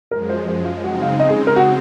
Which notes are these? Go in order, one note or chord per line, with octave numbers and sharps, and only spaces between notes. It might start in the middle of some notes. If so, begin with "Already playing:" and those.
F#2 F3 G#3 A#4
C5
C5
F4
C#3 G#3 C4 D#4 F#4
F5
D#5
G#4
A#4
F#4